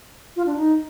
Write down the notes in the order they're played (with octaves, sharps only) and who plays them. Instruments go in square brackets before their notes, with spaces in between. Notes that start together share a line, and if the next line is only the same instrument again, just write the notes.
[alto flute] F4
D4
D#4